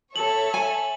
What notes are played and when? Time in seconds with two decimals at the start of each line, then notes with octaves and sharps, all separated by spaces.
0.16 A4 C#5 E5 A5 F#7
0.54 G#5